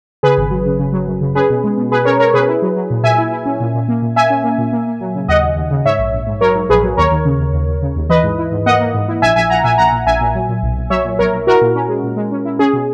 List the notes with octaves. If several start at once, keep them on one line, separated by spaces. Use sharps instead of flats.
C#3 G#4 B4
G#1
F#3
C#3
C#3
F#3
F#2
C#3
C#4 G#4 B4
B2
G#3
B2
B2 G#4 B4
C#4 A#4 C#5
C#4 A#4 C#5
B2 G#4 B4
E4
F#3
F#3
A#2
A#2 E5 G#5
E4
E4
C#4
A#2
A#2
A#3
A#2
A#3 E5 G#5
C#4
A#3
A#2
A#3
A#3
F#3
C#3
D#2 D#5 F#5
D#2
D#2
C#3
G#2 C#5 E5
A#1
A#1
G#2
F#3 A#4 C#5
G#2
A#1 G#4 B4
F#3
D#2 A#4 C#5
D#2
C#3
D#2
D#2
D#2
C#3
D#2
E3 B4 D#5
G#2
E4
G#2
A#3 D#5 F#5
A#3
G#2
E4
A#1 E5 G#5
A#1 E5 G#5
A#1 F#5 A#5
A#2 E5 G#5
A#1 F#5 A#5
A#2
A#1 E5 G#5
A#2
F#3
A#2
B1
B1
F#3 C#5 E5
A#2
B1 A#4 C#5
B1
E4 F#4 A#4
A#2
C#4
G#3
A#2
G#3
C#4
E4
C#4 G#4
B2